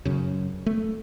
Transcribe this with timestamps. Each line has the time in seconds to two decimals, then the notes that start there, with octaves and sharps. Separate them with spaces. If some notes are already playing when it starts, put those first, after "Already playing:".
0.05 F#2 C#3
0.66 A3